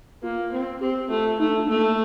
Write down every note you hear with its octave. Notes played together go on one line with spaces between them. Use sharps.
A#3 F4
C4
C4 G4
A3 F4
A3 D#4
D4
F4
A3 A#3